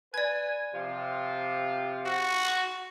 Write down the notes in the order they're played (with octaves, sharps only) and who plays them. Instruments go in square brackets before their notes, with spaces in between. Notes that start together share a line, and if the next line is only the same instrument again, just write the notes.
[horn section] B4 G#5 [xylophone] D5 G#6
[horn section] C3 F3 F4
[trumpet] F#4
[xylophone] C#6